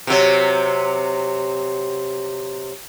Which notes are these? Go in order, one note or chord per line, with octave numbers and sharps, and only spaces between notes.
C3 F#3